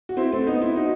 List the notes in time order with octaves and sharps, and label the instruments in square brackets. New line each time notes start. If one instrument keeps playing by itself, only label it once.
[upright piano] F#4
C4 E4
A3 C4
B3 D#4
C4 E4
D#4 F#4